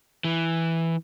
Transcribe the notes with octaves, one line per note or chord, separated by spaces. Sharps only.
E3